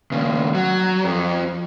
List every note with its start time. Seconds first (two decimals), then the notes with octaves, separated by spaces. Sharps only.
0.11 D#2 C#3
0.55 F#3
1.05 F2